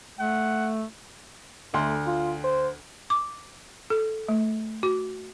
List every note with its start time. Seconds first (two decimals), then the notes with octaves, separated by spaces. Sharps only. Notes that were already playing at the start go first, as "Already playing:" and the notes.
0.19 A3 F#5
1.74 D2 A3 C6
2.06 F4
2.44 C5
3.10 D6
3.90 A4
4.28 A3
4.83 F#4